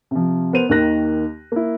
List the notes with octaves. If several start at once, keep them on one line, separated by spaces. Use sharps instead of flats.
C3 F3
B3 A#4 C5 D#7 F7
D#2 D#3 A#3 F#6 A#6
A#3 E4